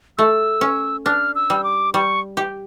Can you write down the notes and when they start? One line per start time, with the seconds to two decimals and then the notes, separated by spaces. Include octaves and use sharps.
0.18 A3 E6
0.61 C#4
1.05 D4 F6
1.35 E6
1.50 G3
1.64 D6
1.94 G3 C#6
2.37 G4